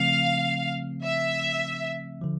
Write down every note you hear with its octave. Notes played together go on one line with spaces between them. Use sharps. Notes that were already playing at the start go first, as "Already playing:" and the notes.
Already playing: C#3 F3 A3 C4 F5
E5
D3 F3